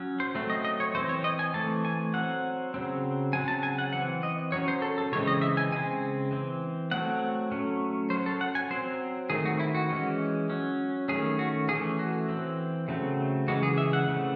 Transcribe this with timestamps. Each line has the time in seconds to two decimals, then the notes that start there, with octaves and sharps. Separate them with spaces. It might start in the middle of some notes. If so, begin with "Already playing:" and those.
Already playing: F#3 C#4
0.20 C5
0.35 F#3 A3 C4
0.50 D#5
0.65 D#5
0.80 C#5
0.95 E3 C4 C5
1.09 C#5
1.24 D#5
1.39 G#5
1.54 E3 A3 C4 A5
1.85 G#5
2.13 F#3 C4 F#5
2.74 C#3 F#3 C4
3.33 C#3 F#3 C4 G#5
3.48 A5
3.63 G#5
3.78 F#5
3.93 E3 C4 F#5
4.23 D#5
4.52 F#3 C#4 C#5
4.68 C5
4.82 A4
4.98 A4
5.12 C#3 E3 G#3 C4 C#5
5.27 D#5
5.42 E5
5.57 G#5
5.72 C#3 G#3 C4 G#5
6.31 E3 C4
6.91 F#3 A3 C4 F#5
7.51 F#3 A3 C#4
8.10 F#3 C#4 C5
8.26 A4
8.41 F#5
8.55 G#5
8.70 F#3 C4 C5
9.30 D#3 A3 C4 G#4
9.45 F#4
9.60 E4
9.75 F#4
9.90 E3 G#3 C#4
10.50 F#3 C#4
11.08 D#3 A3 C#4 G#4
11.39 F#4
11.68 E3 A3 C#4 G#4
11.99 F#4
12.29 E3 C4
12.88 C#3 F#3 A3 C4
13.48 C#3 E3 G#3 F#4
13.63 G#4
13.78 E5
13.93 F#5
14.08 C#3 E3 A3 C4